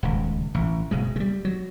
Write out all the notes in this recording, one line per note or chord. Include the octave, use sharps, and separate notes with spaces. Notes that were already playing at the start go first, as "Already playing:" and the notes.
D#1 C#2
A1
F#1 B2 G#3
G3 G#3
F#3